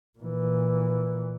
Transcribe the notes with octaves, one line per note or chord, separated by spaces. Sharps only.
A#2 E3